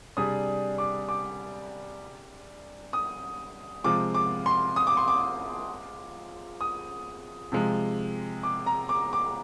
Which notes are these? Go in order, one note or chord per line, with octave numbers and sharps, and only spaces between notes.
C3 G3 D4 G#4 D#6
D6
D6
D#6
C3 F3 G#3 C4 F4 D6
D6
C6
D#6
D6
C6
D6
D#6
C3 F3 G#3
D6
A#5
D6
D6